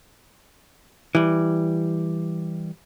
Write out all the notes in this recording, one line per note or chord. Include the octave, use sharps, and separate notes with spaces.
E3 G3